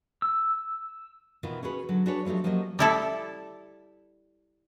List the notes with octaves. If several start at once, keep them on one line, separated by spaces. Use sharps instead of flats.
E6
B2 D#3 E3 F4
C#4 F#4 G#4 B4
D3 F#3
D4 F#4 G#4 B4 C#5
F3 F#3 A3 D#4 G4
F3 F#3 A#3 C#4 G4 D#5
G3 E4 A4